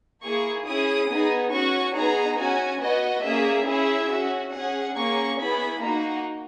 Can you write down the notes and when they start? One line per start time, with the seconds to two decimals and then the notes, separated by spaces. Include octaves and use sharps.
0.23 A#3 E4 G#4 C#6
0.66 C#4 E4 G#4 D#6
1.09 B3 D#4 G#4
1.52 C#4 F#4 C#6
1.95 B3 D#4 G#4 A#5
2.38 C#4 F#4 G#5
2.82 B3 F#4 D#5
3.24 A#3 C#4 G#4 E5
3.67 C#4 E4 G#4 E5
4.10 C#4 F#4
4.54 C#4 G#4 F#5
4.96 A#3 C#4 G#4 C#6
5.39 B3 E4 G#4 B5
5.82 A#3 D#4 F#4 A#5